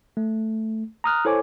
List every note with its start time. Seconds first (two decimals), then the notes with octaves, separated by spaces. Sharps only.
0.17 A3
1.04 A#5 D#6 F6 F#6
1.25 E4 A4 C5 C#5 G#5 D6